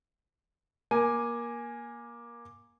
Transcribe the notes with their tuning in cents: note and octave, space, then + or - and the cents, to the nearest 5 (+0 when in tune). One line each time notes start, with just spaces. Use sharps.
A#3 +20 G#5 +0